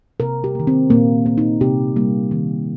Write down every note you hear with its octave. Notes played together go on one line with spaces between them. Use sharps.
C3 A#4
G4
D#3 A#3
C4
A#2 A#3
A#3
D#4
C3 G4
G3 A#3
D#3